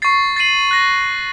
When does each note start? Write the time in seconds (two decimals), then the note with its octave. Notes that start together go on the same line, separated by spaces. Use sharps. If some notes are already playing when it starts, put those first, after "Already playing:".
0.02 C#6 A6 C7
0.36 A6 C7 D#7 F#7
0.71 F#6 A#6